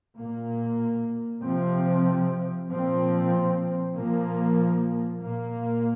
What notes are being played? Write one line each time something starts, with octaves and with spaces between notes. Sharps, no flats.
A#2 A#3
C3 F3 C4
A#2 F3 C4
A#2 F3 A#3
A#2 A#3